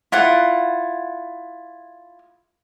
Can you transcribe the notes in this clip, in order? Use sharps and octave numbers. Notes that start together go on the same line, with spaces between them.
E4 F4 F#5